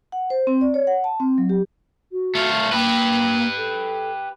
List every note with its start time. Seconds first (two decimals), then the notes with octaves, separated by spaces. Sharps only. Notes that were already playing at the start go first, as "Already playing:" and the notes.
0.12 F#5
0.30 C5
0.47 C4
0.61 D5
0.74 C#5
0.87 F#5
1.04 A5
1.20 C4
1.38 F#3
1.49 G4
2.12 F#4
2.35 A3 F4
2.72 A#3 G4 B4
3.57 A4